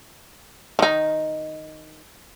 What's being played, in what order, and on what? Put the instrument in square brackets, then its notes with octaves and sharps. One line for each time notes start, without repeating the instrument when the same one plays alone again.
[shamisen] D#3 D#4